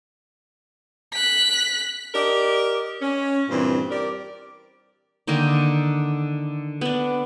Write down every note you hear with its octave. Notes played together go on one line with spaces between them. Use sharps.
F#6 B6
G4 A#4 D5 D#5
C#4
G2 A#2 E3 C4
G4 A#4 D5
D3 D#3 A#3 D#4
B3 D4